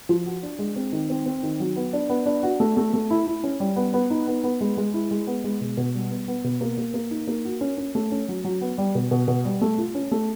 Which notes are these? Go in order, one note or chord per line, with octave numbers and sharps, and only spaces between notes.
F3
F#4
D4
G#3
C4
D#3
C4
C4
D#3
F#3
B3
D4
B3
D4
F#4
A3
A3
A3
E4
E4
C#4
G3
B3
B3
D#4
B3
B3
G#3
G#3
E4
G#3
B3
G#3
B2
B2
G3
B3
B3
B2
A#3
A#3
A#3
D#4
A#3
F#4
C#4
C#4
A3
C#4
F#3
F#3
B3
G3
B2
B2
B2
G3
A3
F4
C#4
A3